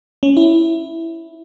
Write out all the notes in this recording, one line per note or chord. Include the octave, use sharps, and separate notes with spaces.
C#4
E4